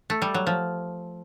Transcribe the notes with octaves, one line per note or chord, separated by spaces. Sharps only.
A3
G3
F#3
F3